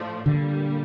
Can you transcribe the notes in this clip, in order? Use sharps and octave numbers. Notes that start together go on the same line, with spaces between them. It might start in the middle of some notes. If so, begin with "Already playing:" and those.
Already playing: A2 F3 A3 D4
A#2 D3 G3 A#3